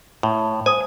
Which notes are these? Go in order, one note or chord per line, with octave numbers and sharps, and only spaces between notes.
A2
C5 G#5 D#6